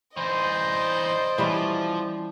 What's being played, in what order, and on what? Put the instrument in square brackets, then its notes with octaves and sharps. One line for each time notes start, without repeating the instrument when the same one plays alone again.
[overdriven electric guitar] E3 D#4 [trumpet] C5 [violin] D5 D#5
[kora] E3 G3 C#4 [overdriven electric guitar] F3